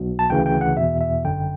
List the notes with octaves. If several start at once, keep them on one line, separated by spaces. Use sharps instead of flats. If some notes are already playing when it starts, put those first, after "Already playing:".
Already playing: B1 B2
A5
D2 C#3 E3 G5
G5
F#5
E2 B2 E5
E5
G1 F#2 D3 G5